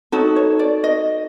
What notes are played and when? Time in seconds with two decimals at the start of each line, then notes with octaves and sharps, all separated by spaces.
0.12 D#4 F#4 A4 C#5
0.36 C#5
0.59 D5
0.84 D#5